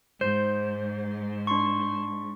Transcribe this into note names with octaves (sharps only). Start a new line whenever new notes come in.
G#2 C5 G6
D4 C6 C#6